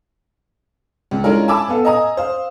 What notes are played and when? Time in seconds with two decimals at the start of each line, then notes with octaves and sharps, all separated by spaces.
1.11 C#2
1.24 G#3 C#4 D4 E4 F4 A#4
1.48 G#5 A5 B5 D6 E6
1.69 B3 A4 F5
1.85 D#5 G#5 A#5 D#6
2.17 C5 F5